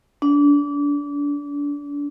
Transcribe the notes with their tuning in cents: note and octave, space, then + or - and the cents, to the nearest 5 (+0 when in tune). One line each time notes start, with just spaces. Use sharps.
D4 -30